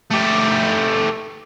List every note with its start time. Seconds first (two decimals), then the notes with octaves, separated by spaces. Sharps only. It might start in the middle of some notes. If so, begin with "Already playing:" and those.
0.11 A3 G4